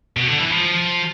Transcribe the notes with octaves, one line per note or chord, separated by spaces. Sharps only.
B2
D3
E3
F3